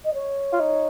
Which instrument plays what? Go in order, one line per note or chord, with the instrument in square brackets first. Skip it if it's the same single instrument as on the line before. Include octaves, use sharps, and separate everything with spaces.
[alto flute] D#5
C#5
[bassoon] F4
D#4